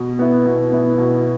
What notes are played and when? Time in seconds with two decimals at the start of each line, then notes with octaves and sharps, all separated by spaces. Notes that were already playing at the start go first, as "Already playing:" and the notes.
Already playing: B2
0.19 B3 E4
0.45 B2
0.72 B3 E4
0.98 B2